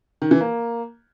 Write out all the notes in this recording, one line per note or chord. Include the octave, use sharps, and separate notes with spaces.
D#3
E3
A#3